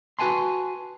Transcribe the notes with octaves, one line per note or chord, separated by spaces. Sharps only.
F#4 B4 G#5 A5 C6